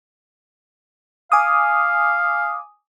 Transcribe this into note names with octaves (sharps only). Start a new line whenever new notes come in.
F5 G#5 D6 D#6